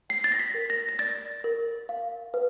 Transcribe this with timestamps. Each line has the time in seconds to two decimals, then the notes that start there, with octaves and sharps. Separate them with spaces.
0.09 G5 C7
0.24 A6
0.32 A#6
0.39 B6
0.55 A#4
0.70 A#6
0.89 A#6
0.99 D5 A6
1.44 A#4
1.89 F5
2.34 B4